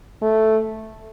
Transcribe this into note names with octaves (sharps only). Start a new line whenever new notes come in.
A3